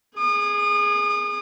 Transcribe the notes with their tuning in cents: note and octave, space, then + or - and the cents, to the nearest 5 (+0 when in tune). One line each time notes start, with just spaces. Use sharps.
G#4 +0 D#6 -35